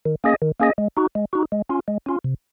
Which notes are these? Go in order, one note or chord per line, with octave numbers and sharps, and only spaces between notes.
D#3
A#3 C#4 G#4 D#5
D#3
A#3 C#4 G#4 D#5
G#3
D#4 F#4
G#3
D#4 F#4
G#3
C#4 F4
G#3
C#4 F4
C3